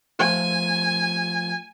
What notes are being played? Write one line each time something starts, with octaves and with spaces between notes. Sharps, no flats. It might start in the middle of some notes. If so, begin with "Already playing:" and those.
F3 A3 F4 G#5